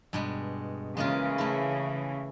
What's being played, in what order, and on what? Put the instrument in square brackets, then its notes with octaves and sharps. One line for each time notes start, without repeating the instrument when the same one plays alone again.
[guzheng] G2 B2 G#3
[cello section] C#3 E3 [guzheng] G#3 A#3 F4
[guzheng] A3 E4